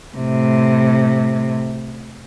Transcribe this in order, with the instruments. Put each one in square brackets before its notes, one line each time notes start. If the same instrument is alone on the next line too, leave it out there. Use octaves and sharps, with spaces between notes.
[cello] A2 C3